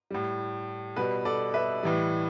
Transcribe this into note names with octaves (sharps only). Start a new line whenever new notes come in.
A2 G3
B2 G3 B4
A4 D5
B4 E5
A2 E3 G3